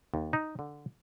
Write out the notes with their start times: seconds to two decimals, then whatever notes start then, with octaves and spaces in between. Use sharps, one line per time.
0.14 D#2
0.33 D#4
0.59 D3